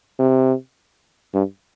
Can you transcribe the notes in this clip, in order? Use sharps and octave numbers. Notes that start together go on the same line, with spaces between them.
C3
G2